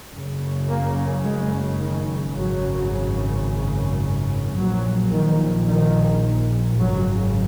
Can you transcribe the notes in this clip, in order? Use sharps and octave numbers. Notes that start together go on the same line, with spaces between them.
F#1 F#2 C#3
A#3
G#3
D#3
G#1 F#2 C#3 F#3
A#1 A#2 F#3
D#3
D#3
G#1 F#2 C#3 F#3